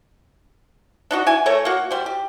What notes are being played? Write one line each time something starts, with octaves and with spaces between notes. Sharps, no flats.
D4 D#4 F#4
E4 G#5
A3 A4 A#4 C#5
A#3 F#4
G3 C5
G4